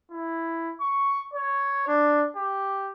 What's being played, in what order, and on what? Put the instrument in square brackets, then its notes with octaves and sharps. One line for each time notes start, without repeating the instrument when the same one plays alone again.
[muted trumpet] E4
C#6
C#5
D4
G4